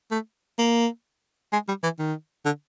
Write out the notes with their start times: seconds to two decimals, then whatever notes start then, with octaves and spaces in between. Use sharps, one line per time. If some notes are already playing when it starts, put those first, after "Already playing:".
0.11 A3
0.59 A#3
1.53 G#3
1.68 G3
1.83 E3
1.99 D#3
2.46 D3